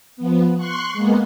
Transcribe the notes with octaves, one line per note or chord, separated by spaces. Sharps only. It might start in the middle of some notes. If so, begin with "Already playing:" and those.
F3 B3
C6 C#6 F#6
G#3 A#3 B3